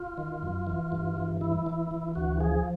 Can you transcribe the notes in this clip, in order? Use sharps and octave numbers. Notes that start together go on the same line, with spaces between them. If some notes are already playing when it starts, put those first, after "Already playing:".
Already playing: F4
D#3
F#2
E3
G2
E3
E3 E4
E3
E3
D2 F#4
F3 G#4